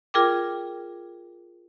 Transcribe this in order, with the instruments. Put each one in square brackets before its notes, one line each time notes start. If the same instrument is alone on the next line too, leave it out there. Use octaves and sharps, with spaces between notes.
[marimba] F4 G#4 A#4 G5 D6